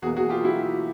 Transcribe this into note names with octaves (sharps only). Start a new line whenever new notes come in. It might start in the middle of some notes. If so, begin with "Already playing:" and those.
E2 B2 F#3 A#3 F#4 G#4
F#4 G#4
F4 G4
E4 F#4